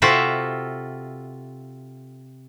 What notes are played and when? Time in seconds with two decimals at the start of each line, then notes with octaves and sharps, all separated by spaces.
0.02 C3 F4 F#4 A4 E5 G5